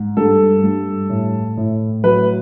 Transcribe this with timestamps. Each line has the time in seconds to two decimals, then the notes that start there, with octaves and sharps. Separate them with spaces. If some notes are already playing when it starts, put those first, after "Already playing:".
Already playing: G#2
0.17 G2 A4
0.64 G2
1.10 A2
1.57 A2
2.04 F#3 B4